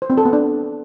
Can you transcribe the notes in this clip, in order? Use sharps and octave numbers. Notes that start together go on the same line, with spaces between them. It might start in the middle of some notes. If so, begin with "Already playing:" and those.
C5
C4
A4
B3
D4